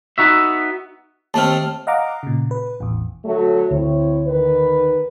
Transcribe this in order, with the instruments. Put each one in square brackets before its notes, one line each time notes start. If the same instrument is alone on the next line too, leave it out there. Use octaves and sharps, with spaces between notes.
[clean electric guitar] B3 D#4 F#4 E5
[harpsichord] D#2 A3 C4 [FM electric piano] A5 F6
[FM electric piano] D#5 F5 F#5 A#5 D6
A#2 C#3
B4
A1 E2
[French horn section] D3 F#3 A3
[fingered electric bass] D2 [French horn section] C4 E4 C#5
[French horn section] D#3 B4